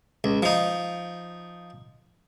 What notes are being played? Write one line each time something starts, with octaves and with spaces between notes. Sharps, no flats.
C#2
F3 D#4